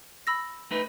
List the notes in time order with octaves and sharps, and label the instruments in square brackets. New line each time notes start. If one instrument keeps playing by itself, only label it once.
[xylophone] B5 E6 A#6
[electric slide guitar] A3 D#4 B4